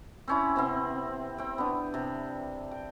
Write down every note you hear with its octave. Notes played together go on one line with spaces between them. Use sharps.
C4 C#4 E4
C3 B3 C4 C6
C4 G5
B3 D4
C3
G5